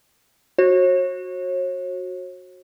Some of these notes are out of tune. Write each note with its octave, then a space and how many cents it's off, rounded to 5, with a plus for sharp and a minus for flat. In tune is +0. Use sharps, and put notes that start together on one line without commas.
F#4 -10 C#5 -45